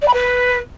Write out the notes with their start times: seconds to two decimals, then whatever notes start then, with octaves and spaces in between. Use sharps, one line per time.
0.02 D5
0.08 B5
0.14 B4